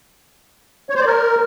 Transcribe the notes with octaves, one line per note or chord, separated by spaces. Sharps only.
C#5
C5
D5
A#4